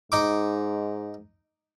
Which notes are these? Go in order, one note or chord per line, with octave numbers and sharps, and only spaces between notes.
G#2 D#4 D6